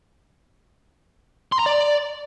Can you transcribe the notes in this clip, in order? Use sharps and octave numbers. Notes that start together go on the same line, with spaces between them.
C6
A#5
D5